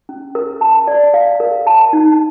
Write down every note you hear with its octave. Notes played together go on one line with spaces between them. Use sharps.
C#4
A#4
A5
D5
F5
A#4
A5
D#4